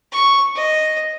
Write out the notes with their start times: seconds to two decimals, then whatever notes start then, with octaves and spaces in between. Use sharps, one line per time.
0.12 C#6
0.56 D#5